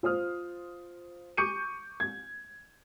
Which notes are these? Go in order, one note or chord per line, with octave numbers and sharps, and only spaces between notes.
F4 C5 D#6 F6
C#6 D6 G6 C#7 D#7
G#6